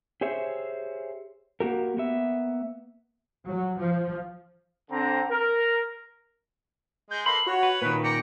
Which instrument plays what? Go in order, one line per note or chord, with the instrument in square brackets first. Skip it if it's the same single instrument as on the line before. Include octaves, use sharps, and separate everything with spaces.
[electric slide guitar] G4 G#4 C5 C#5 E5
A#3 F#4 G4 A#4
A#3 B3 E5
[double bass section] F#3
F3
[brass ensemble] D3 C4 A#5
A#4
[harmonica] G#3 [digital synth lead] G6
[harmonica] A#3 A4 B4 [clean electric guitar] B5 [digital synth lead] C6
[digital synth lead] F#4 [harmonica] C#5
[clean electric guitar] B4
[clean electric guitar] A#2 D#3 [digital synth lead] B4
[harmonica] D5 G5 A#5 [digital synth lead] C#7